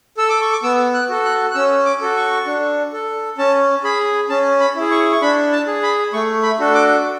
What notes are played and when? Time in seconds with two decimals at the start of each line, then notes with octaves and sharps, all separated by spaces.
0.17 A4 E6
0.29 D6
0.41 C#6
0.52 D6
0.63 B3 E6
0.94 F#6
1.09 F#4 A4
1.25 F#6
1.51 F#6
1.55 C#4 E6
1.85 D6
2.01 F#4 A4
2.16 C#6
2.46 D4
2.93 A4
3.38 C#4 A5
3.84 G#4 B5
4.30 C#4 A5
4.60 B5
4.76 E4 G#4
4.91 C#6
5.12 C#6
5.21 D4 B5
5.52 A5
5.67 G#4
5.83 B5
6.13 A3 C#6
6.43 B5
6.59 D4 F#4 A4
6.75 D6